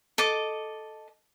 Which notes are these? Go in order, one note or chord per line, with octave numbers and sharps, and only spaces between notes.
A4 D#5 D6